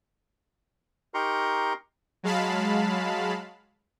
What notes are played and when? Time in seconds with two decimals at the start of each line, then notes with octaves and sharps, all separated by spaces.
1.14 D#4 G4 A#4 A#5 C6 C#6
2.23 F#3 G#3 F5 A5 B5